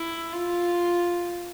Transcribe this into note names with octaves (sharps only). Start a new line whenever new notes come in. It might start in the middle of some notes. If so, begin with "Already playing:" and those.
Already playing: E4
F4